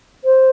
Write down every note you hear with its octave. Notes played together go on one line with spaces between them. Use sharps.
C5